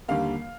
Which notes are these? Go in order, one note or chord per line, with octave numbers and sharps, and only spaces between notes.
D#2 D3 G3 A#3 F5